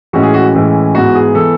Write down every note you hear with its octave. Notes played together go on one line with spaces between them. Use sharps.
A2 E3 G#3 C#4 F#4
G#4
F#4
A2 E3 G#3 C#4
G#2 E3 B3 F#4
G#4
E3 B3 A4